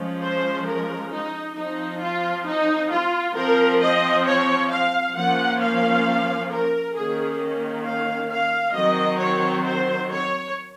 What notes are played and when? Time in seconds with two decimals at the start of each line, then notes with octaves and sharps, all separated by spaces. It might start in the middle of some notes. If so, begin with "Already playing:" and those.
Already playing: F3 G#3 C#4
0.21 C5
0.67 A#4
1.10 D#4
1.56 F3 C4 D#4
2.00 F4
2.46 D#4
2.91 F4
3.35 F3 C4 A#4
3.80 D#5
4.26 C#5
4.70 F5
5.15 F3 A#3 C#4 F#5
5.60 F5
6.50 A#4
6.94 D#3 A#3 C#4 G#4
7.84 F5
8.30 F5
8.74 D#3 F#3 C4 D#5
9.19 C#5
9.64 C5
10.09 C#5